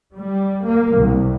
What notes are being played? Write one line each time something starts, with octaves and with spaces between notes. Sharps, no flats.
G3
A#3
C2